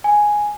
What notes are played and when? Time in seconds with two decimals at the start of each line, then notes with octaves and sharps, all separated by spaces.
0.04 G#5